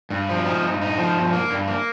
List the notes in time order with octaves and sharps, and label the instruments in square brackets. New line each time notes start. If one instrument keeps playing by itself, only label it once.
[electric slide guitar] G2
F3
D#4
G2
D#4
F3
G2
A#3
G2
A#3